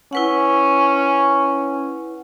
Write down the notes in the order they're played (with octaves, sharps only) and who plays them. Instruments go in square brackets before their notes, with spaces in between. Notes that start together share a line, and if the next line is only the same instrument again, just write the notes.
[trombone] C#4 [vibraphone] E4 B4 F#5